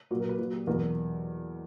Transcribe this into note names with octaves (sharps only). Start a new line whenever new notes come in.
A#2 F#3 F#4
A#4
B4
A#2 F#3
G4
E2 B2 F#3 A#4